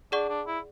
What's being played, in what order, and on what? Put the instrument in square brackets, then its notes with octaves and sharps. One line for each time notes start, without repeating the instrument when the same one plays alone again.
[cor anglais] D4 [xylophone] G#4 D5 F#5 C#6
[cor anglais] D4
E4